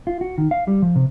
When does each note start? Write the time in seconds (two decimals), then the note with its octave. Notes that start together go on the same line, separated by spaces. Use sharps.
0.07 F4
0.21 F#4
0.38 D#3
0.51 F5
0.68 G3
0.82 F3
0.96 C3